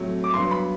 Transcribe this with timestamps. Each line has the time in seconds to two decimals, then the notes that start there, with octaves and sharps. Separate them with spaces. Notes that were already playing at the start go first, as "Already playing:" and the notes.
Already playing: A2 F#3 A3 C4
0.24 D6
0.33 G2 F#3 B3 C6
0.51 B5